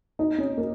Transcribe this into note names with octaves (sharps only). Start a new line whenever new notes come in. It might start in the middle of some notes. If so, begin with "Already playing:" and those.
D#4
C#4
A#3